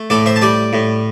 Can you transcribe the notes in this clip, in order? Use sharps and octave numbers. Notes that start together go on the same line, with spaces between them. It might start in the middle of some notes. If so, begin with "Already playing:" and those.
Already playing: A3
A2 A4 D5
C5 E5
A5
G3 D5 G5
A2